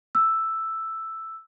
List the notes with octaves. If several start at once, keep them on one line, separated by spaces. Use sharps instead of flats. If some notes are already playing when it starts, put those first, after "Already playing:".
E6